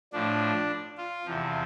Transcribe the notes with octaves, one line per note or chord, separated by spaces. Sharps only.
A2 F3 D4
F4
E2 C3 F3